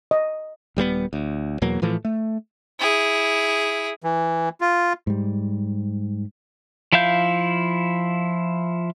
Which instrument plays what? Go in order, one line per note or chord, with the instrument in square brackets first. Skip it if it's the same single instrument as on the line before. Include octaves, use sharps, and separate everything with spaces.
[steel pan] D#5
[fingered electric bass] D#1 G3 A3 B3
D2
E2 B2 F#3 A#3
A2 E3 F3 A3
A3
[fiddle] E4 G#4
[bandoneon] E3
F4
[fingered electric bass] G#2 G3
[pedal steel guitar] F3 E4 E5 F5 G6